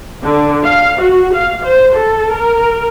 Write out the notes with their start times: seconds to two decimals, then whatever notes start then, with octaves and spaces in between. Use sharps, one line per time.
0.24 D3
0.62 F5
1.01 F#4
1.34 F5
1.64 C5
1.95 A4
2.34 A#4